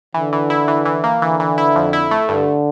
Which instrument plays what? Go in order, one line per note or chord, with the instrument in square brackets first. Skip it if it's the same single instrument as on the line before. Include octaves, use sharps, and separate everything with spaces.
[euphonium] D3 [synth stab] E3
[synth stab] E3
E4
E3
E3
A#3
[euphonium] D3 [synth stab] E3
[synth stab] E3
E4
F2
E4
A3
[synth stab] G2 [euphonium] D3